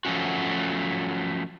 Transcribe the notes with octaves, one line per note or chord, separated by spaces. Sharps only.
F3 F#3 A3 C#4 F#4